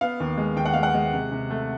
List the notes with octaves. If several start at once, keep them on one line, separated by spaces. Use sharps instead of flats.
B3 F5
D#2
G#3
D#2 G5
F#5
G#3 F5
F#5
G#3
C3
C3
A3